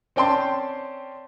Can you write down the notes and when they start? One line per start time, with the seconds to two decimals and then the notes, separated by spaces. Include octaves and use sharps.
0.16 C4 C#4 D5 G5 A5 C6